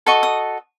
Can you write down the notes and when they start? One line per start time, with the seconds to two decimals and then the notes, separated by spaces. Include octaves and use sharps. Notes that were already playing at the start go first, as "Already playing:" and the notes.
0.06 F#4 A4 D#5 C#6
0.23 D#6